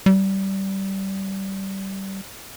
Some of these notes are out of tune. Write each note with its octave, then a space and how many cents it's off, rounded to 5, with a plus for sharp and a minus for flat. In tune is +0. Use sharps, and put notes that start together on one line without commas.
G3 -20